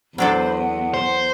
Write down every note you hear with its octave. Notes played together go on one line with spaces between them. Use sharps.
E2 F#3 D4 A4 C5 B5
F#5
C5